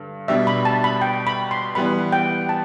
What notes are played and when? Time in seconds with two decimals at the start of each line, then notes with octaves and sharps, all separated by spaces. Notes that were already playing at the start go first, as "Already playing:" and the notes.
Already playing: G2 D3
0.28 B2 G3 D4 E5
0.47 B5
0.65 A5
0.84 B5
1.02 G5
1.27 B5
1.51 C6
1.75 E3 G3 B3 B5
2.12 G5
2.49 A5